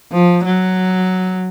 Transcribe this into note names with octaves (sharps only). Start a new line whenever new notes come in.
F3
F#3